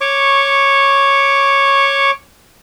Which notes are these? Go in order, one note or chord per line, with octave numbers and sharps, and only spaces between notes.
C#5 C#6 D6